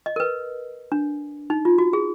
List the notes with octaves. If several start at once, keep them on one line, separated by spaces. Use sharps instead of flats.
D#5
A#4
B4
D4
D#4
F4
F#4
G#4